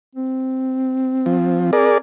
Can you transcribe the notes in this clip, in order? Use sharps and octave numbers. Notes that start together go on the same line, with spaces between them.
C4
F3
G#4 A#4 D5